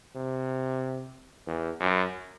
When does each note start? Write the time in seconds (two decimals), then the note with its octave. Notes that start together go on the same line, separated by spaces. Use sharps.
0.15 C3
1.47 E2
1.80 F#2